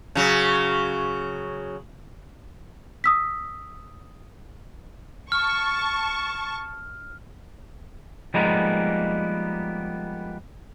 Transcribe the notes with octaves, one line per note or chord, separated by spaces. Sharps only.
C#3 F#3
D#6 E6 B6
A5 C#6 F6
F3 G3 G#3 A#3 B3 D#4